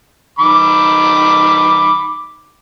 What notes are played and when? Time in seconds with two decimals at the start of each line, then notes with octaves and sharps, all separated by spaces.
0.39 D#3 B5 D6